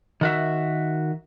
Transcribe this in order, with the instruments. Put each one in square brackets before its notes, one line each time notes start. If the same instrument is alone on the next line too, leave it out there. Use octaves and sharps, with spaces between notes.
[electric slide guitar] D#3 F#4 E5